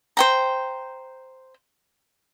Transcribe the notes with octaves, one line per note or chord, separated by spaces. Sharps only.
C5 G5 A#5